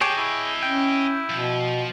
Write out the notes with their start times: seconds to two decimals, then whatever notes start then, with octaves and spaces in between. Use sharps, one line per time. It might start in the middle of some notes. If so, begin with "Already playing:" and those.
0.01 G4 G#4 C#5 D#5 G5 A5
0.18 E4
0.63 C#4 G5
1.30 B2 F3